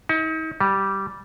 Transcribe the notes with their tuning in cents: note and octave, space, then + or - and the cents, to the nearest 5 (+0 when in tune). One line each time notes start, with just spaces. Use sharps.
D#4 +40
G3 -10